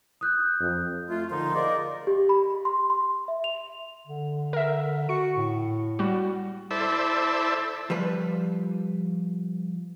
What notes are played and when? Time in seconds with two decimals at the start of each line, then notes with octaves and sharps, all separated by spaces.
0.21 D#6 F#6 G6
0.60 F2
1.09 A3 F4
1.30 A#2 D3 F3 D#4 C6
1.54 F4 G#4 A#4 D5 D#5
2.07 G4
2.29 B5
2.65 C6
2.90 C6
3.28 E5
3.44 F7
4.07 D3
4.53 A#4 E5
5.09 F#4 C#7
5.37 A2
5.99 G3 F#4
6.71 E4 A4 C5 D5 E5
7.90 F3 G3 B4